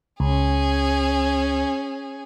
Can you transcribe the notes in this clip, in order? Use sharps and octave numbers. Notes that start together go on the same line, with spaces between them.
C#2 C#4 G#4